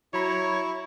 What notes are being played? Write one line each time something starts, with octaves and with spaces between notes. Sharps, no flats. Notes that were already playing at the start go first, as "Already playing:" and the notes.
F#3 E4 C#5 A#5 B5